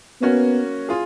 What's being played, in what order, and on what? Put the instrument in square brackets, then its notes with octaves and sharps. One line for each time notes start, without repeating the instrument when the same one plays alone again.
[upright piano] A#3 C#4 F#4 C#5 [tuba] B3
[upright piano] F4 G#4